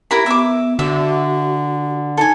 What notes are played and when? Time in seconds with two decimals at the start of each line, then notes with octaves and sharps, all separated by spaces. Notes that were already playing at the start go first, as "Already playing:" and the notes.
0.11 E4 G4 A#4 B5
0.26 B3 E5 D6
0.79 D3 F#4 E5
2.17 D#4 A4 G#5